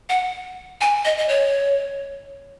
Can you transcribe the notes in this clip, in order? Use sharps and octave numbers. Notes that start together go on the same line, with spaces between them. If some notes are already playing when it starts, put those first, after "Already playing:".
F#5
G#5
D#5
D#5
C#5